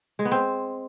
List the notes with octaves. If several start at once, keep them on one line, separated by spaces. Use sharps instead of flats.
G#3
B3
C4